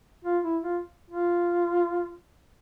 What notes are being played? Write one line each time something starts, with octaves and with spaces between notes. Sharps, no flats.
F4
E4
F4
F4